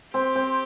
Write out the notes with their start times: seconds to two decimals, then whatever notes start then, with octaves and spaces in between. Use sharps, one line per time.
0.14 C4 G4
0.35 C4